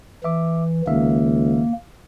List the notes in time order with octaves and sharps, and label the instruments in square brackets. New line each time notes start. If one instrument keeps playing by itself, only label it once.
[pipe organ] E3 [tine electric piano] E5 D6
[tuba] C#2 [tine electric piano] D#3 E5 F5 [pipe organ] A#3